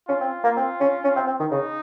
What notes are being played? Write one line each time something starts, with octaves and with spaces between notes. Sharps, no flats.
C#4 F4
C4
A#3
C4
C#4
C#4
C4
C4
D#3
C#3 D#4